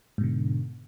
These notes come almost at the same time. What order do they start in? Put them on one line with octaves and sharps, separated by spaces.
G#2 B2 D3